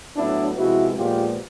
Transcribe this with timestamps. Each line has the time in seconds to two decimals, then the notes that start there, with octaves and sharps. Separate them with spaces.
0.17 A2 F#3 B3 D4 E4
0.56 C3 F3 G#3 B3 E4 F#4
0.96 A#2 F3 G#3 B3 F4 G4